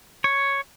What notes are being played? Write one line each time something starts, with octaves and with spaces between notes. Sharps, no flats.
C#5